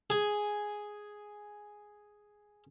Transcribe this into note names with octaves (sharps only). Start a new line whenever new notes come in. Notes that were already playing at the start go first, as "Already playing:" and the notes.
G#4 G#5